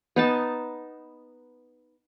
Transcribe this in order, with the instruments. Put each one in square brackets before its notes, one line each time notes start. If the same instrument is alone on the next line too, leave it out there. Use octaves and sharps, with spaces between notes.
[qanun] B3 D#4 A5